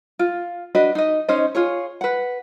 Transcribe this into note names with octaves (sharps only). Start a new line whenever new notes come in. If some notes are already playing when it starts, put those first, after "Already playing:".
F4
D4 F#4 B4 D#5
D#4 D#5
C#4 D#4 C5 D#5
F4 G#4 C#5
B4 F#5